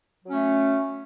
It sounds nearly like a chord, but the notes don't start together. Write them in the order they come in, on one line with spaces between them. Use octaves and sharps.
F#3 C#4 A3